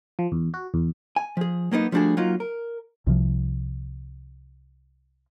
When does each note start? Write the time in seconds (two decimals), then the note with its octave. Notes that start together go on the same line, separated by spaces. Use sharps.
0.19 F3
0.32 E2
0.54 F#4
0.74 E2
1.16 G#5
1.37 F3 G#4
1.71 F#3 A#3 B3 D#4
1.92 F3 G3 A3 D4 F#4 G#4
2.17 F#3 A#3 D#4 F4
2.40 A#4
3.07 C2 C3 F3